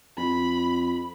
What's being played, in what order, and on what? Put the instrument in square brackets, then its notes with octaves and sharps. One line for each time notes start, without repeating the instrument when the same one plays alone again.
[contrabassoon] F2 [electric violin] B5